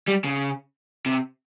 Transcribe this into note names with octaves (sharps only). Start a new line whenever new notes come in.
G3
C#3
C3